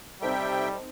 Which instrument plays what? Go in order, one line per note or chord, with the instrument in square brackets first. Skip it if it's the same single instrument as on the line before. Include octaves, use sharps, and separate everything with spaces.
[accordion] C3 E5 G5 [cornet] G3 [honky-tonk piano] C4 D#4 A4